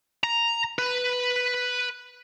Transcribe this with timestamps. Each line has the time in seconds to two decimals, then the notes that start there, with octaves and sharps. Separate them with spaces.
0.24 A#5
0.79 B4